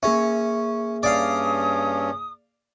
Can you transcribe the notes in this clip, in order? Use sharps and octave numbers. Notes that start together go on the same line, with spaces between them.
A#3 C#4 G#4 E5
G2 C#4 D5 F5 D#6